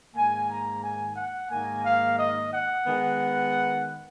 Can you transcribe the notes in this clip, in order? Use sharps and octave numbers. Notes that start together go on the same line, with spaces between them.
G#2 D#3 A#3 G#5
A#5
G#5
F#5
G#2 D#3 A#3 D#4 G#5
F5
D#5
F#5
D#3 G#3 B3